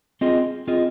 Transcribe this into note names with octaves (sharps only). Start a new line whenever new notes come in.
C4 F4 G#4 D#5
C4 F4 G#4 D#5